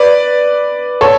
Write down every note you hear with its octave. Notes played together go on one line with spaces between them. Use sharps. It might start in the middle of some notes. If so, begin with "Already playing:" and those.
Already playing: B4 D5
A4 C#5